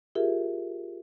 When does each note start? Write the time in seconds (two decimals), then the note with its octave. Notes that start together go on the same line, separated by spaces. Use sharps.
0.15 F4 G4 G#4 A#4 E5